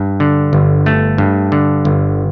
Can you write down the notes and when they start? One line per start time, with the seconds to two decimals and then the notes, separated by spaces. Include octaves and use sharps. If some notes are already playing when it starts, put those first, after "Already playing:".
Already playing: G2
0.20 D3
0.53 G1
0.86 A3
1.18 G2
1.52 D3
1.85 G1